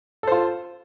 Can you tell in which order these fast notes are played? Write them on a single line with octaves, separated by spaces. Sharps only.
A4 C5 F4